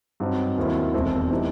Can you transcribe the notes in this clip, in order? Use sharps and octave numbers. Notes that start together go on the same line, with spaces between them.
G2 F#3 C4 D#4
D#2 D#3 F#3 C4 E4
E1 E2 D#3 A3 C4
E3 G3 C4 D#4